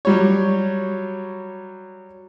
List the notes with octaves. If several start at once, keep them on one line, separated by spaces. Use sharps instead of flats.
F#3 G3 C#5